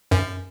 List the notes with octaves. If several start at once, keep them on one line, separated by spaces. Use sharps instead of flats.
F#2